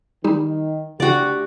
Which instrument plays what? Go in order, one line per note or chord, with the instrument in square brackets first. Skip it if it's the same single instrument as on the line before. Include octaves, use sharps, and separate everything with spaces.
[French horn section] D#3 [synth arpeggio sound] G3 D#4 G4
[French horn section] D2 G4 [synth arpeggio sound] C#3 [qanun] F#4 D5